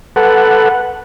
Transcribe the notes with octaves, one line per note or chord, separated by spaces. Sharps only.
A4 B4 F#5